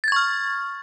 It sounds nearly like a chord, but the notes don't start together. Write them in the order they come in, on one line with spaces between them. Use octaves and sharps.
A6 G#6 C#6 F6